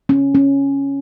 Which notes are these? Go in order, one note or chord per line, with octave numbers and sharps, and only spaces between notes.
C#4
C#4